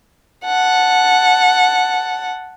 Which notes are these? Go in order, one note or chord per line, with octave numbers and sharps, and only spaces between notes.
F#5 A5